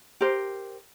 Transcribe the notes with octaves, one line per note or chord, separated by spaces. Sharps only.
G4 A#4 C5